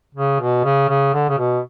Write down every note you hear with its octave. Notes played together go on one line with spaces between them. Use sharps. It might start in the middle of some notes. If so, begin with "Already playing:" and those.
C#3
B2
C#3
C#3
D3
C#3
B2